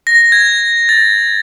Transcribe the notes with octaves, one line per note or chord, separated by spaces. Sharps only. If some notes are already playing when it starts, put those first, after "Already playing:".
A#6
G#6
A6